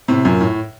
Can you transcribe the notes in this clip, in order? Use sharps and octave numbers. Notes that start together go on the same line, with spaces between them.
A2 C3
F#2 A#2
A2